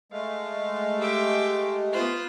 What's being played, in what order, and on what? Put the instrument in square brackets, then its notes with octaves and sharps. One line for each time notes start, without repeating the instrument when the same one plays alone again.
[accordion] G#3 A3 [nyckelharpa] F5
[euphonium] G4 [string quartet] E5 G5 D6
[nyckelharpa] B3 F4 [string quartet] C5 F#6